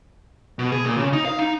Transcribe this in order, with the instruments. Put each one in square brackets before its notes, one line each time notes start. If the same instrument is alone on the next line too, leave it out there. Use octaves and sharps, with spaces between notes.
[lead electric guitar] B2
G#4
A#2
C#3
D#4
F5
D#4